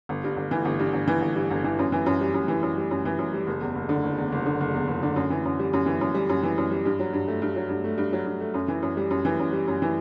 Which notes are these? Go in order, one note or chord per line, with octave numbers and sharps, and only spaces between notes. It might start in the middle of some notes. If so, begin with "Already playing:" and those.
G1
G2
G1
E3
G1
G2
G1
E3
G1
G2
G1
E3
F#2
E3
F#2
G3
F#2
E3
F#2
G3
F#2
E3
F#2
G3
F#1
E2
F#1
D3
F#1
E2
F#1
D3
F#1
E2
F#1
D3
F#2
E3
F#2
G3
F#2
E3
F#2
G3
F#2
E3
F#2
G3
G2
F#3
G2
A3
G2
F#3
G2
A3
G2
F#3
G2
A3
F#2
E3
F#2
G3
F#2
E3
F#2
G3
F#2
E3